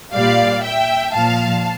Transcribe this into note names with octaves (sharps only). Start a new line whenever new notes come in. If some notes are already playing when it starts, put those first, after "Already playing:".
A#2 G3 D5 F5
E5 G5
A#2 F3 F5 A5